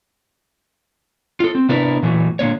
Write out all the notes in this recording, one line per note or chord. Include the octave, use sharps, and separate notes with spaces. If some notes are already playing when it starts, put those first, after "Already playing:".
F4 A4
C4
C3 B3 D4 E4 A#4 B4
A#2 E3 F#3 A3
A#2 D3 A#3 C#5